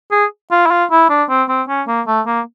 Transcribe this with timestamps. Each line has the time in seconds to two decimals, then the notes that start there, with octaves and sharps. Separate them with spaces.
0.11 G#4
0.51 F4
0.66 E4
0.71 F4
0.91 E4
1.10 D4
1.29 C4
1.49 C4
1.68 C#4
1.88 A#3
2.07 A3
2.27 A#3